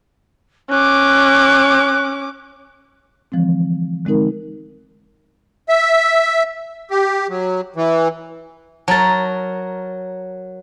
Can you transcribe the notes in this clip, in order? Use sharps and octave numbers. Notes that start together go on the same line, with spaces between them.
C#4 D6 F#6
D3 E3 F3 G#3 C4
D3 G#3 C4 D#4 A#4
E5
G4
F#3
E3
F#3 A#4 A5 A#5 A6